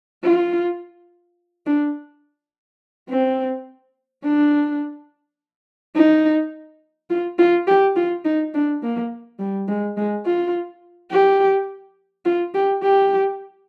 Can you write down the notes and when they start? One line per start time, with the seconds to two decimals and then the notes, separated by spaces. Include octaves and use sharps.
0.24 F4
1.66 D4
3.09 C4
4.24 D4
5.95 D#4
7.10 F4
7.39 F4
7.67 G4
7.96 F4
8.25 D#4
8.54 D4
8.83 A#3
9.39 G3
9.68 G#3
9.97 G#3
10.25 F4
11.11 G4
12.25 F4
12.54 G4
12.83 G4